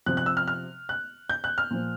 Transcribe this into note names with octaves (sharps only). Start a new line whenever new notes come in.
C3 F3 F#6
F#6
E6
F6
F6
F#6
G6
F#6
F6
A#2 F3